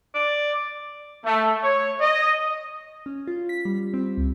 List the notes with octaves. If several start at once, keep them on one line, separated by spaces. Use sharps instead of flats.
D5
A3
C#5
D#5
C#4
F4
B6
G3
C4
C#2